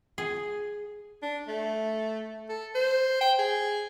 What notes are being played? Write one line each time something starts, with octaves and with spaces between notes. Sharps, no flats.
G#4
D4
A3
A4
C5
G5
G#4